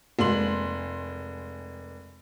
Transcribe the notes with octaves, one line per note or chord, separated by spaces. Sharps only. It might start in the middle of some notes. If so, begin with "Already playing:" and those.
F1 G#3 A#3 C6 F#7